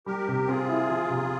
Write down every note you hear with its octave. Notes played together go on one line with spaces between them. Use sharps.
G3 G4 A#4
C3
C4 F4 G#4
E4
F3
C3